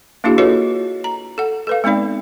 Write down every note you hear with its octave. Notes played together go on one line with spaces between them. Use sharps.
A#3 D4 E4 F#4 G#4
F4 F#4 A4 B4 C#5 D#5
A#5
A4 F#5
A4 B4 F5
G#3 B3 C4 D#4 D5